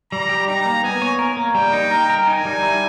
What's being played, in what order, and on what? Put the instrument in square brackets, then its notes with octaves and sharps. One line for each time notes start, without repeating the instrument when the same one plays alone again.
[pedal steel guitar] G3 [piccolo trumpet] A#5
[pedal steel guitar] G4
[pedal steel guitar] D#4 [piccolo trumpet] A#5
[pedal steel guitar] A#3
[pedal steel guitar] B3 [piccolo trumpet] G#5
[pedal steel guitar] C#5
A#4
A#3
[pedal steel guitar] G3 [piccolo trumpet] G5
[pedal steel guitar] D#4
A#4
A#4
[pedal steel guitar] D#4 [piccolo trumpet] G#5
[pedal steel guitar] G3
E4